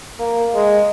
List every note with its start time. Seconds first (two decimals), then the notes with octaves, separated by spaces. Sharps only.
0.20 A#3
0.54 G#3